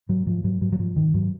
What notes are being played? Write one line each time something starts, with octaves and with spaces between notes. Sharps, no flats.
G#2 F#3
G#2 F3
G#2 F#3
G#2 F#3
F#3
G#2 F3
G#2 D#3
G#2 F#3